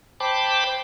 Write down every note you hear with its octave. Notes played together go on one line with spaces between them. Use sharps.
C5 G5 A5 B5 D6